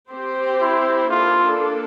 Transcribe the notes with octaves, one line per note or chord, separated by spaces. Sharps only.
C4 G4 C5
E4
A#3 D4 F4 A4